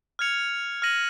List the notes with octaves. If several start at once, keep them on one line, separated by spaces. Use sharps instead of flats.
F6 G#6 C#7 F7
F6 A#6 D#7 F#7